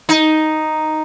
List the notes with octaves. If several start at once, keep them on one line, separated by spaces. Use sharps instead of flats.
D#4